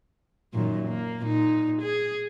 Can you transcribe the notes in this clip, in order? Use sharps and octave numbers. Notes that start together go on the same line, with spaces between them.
F#2 A#2 D#3
A#3
A#2 D#4
G#4